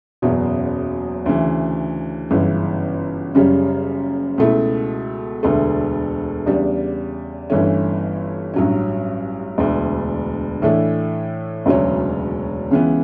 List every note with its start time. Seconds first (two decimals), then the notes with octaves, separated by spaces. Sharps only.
0.22 F#1 E2 B2 F#3 C#4
1.26 D2 C#3 E3
2.31 G1 F#2 C#3 E3
3.35 F#1 F#2 C#3 G3 C#4
4.38 C#2 B2 A3 E4
5.43 E1 D2 D3 A3
6.46 E2 C#3 G3 D4
7.50 G1 G2 E3 A3 C#4
8.54 A1 G2 F#3 C#4
9.58 E1 D2 D3
10.62 A2 E3 A3 D4
11.66 E1 D2 C#3 F#3 C#4
12.71 C#2 C#3 E3 B3